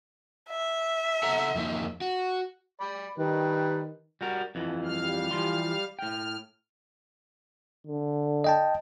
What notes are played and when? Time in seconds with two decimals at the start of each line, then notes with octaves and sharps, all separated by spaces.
0.50 E5
1.23 A4 F#5 A#5
1.55 F2 A#3 D#4
2.01 F#4
2.81 D5 B5
3.18 D#3 G3 B4
4.21 G3 F#4 A#4
4.55 F2 E3
4.84 G3 F5 F6
5.31 E3 F3 C6
5.99 A2 G5 F6
7.87 D3
8.44 D#5 G5 A5